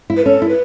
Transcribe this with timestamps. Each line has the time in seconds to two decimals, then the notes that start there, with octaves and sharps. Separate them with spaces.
0.10 E4
0.17 B4
0.25 C#4 A4
0.42 E4
0.49 B4